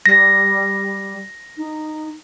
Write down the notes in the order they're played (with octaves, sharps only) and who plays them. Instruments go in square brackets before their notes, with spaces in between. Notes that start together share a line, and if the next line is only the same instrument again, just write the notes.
[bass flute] G3 [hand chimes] A#6
[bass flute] D#4